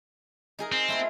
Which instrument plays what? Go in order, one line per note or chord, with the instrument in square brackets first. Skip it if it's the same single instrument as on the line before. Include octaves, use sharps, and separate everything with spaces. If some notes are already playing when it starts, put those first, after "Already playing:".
[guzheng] D#4 G#4 A#4
[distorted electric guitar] C4
[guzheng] A3 E4 F4